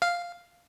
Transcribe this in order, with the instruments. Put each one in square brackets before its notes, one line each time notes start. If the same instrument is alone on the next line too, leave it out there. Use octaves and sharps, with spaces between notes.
[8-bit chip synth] F5